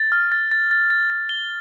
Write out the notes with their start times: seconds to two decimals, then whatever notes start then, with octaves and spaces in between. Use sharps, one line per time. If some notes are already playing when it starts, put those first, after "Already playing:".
Already playing: A6
0.12 F6
0.32 A6
0.51 A6
0.71 A6
0.90 A6
1.10 A6
1.29 G7